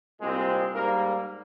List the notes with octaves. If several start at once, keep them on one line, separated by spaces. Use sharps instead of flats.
C2 A#2 G#3 C4
G#2 G3 A#3 A#4